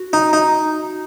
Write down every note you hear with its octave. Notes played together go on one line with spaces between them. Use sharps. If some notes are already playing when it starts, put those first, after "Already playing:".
Already playing: F#4
D#4
D#4